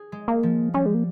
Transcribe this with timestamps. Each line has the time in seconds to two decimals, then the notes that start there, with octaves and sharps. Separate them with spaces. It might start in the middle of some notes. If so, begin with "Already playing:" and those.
Already playing: G#4
0.12 G#3
0.28 A#3
0.43 F3
0.74 G3 C#4
0.86 G#3
0.94 A#3